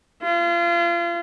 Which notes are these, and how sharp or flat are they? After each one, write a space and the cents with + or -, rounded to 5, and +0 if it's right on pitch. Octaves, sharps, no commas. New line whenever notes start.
F4 -30